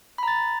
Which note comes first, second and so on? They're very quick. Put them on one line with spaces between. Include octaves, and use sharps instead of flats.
B5 A#5 A6